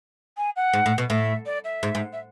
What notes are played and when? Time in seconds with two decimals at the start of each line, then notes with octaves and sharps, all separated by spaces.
0.37 G#5
0.56 F#5
0.73 G#2
0.86 A2
0.98 B2
1.09 A2 E5
1.46 D5
1.64 E5
1.83 G#2
1.95 G#2
2.13 E5